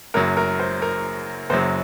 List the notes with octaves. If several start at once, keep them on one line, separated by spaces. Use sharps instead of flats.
F#1 F#2 F#3 A#4
A#4
C5
A#4
F#1 F#2 F#3 C5